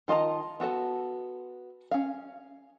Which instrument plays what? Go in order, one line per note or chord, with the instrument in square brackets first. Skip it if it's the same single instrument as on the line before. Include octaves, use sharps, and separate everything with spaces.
[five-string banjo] D#3 F4 D#5 A5 A#5
B3 F#4 A4 A5
C#4 F5